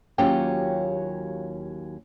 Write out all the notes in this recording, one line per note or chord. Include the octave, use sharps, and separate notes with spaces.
D#2 F#3 C#4 F4 G4 G5